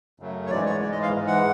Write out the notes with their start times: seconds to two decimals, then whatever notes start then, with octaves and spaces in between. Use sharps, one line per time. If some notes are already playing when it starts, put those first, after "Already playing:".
0.20 F#2 C#3 F#3 A3
0.46 C#5
0.50 G#2 E3 G#3 D5
0.66 C#5
0.81 G#2 E3 G#3 D5
0.92 D#5
1.03 F5
1.13 G#2 E3 G#3
1.27 F#5